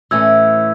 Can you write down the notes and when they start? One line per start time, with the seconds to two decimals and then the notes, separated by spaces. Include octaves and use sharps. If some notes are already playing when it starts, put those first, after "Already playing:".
0.11 A2 E3 A3 C#4 E4 E6 G#6